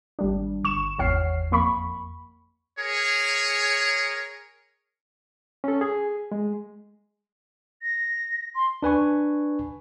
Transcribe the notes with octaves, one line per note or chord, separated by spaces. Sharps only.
G#1 G3 D4
G1 C#6 E7
G#1 E2 C#5 F#5 F6 C7
F2 A#3 B5 C#6
G#4 A#4 C#5
C#4 A4
G#4
G#3
A#6
C6
D4 B4 G#5 C#6